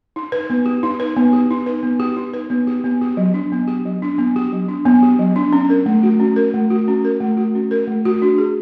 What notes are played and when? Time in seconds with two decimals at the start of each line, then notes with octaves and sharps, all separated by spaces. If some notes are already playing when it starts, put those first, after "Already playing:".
0.16 D#4
0.32 B4
0.50 B3
0.66 G4
0.83 D#4
1.00 B4
1.16 B3
1.33 G4
1.50 D#4
1.66 B4
1.83 B3
2.00 G4
2.16 D#4
2.34 B4
2.50 B3
2.67 G4
2.84 B3
3.01 G4
3.17 F#3
3.34 D4
3.52 B3
3.68 G4
3.86 F#3
4.02 D4
4.18 B3
4.36 G4
4.53 F#3
4.69 D4
4.86 B3
5.03 G4
5.19 F#3
5.36 D4
5.53 C#4
5.70 A#4
5.86 A3
6.03 F#4
6.20 C#4
6.36 A#4
6.54 A3
6.71 F#4
6.88 C#4
7.05 A#4
7.20 A3
7.37 F#4
7.55 C#4
7.71 A#4
7.87 A3
8.05 F#4
8.22 D4
8.38 G#4